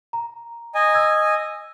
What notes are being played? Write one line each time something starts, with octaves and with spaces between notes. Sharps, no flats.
A#5
D#5 G#5
E6 G#6